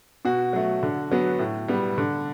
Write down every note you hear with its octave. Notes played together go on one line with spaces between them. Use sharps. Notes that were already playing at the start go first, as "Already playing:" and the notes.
B2 F#4
F#3 A3
D3
F#3 B3
A2
G3 B3
D3